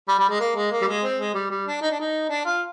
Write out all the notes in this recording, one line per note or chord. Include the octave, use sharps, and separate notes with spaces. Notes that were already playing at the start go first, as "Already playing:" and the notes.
G3
G3
G#3
A#3
G#3
A#3
G3
G#3
C4
G#3
G3
G3
D4
D#4
D4
D#4
D4
F4